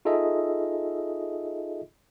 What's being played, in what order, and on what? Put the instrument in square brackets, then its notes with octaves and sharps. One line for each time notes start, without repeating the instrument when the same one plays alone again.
[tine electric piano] D#4 F4 G#4 A4 D#5 E5